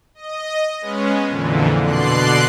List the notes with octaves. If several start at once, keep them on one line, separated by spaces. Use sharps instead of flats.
D#5
G#3 B3 C#4
F2 A#2 D3 E3
B2 D3 D5 C6 F#6 C7